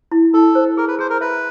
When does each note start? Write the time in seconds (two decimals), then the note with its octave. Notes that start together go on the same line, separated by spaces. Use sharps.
0.12 E4
0.34 E4 A4
0.55 C5
0.77 G#4 A#4
0.88 B4
0.99 G#4 C5
1.10 A#4
1.21 B4 E5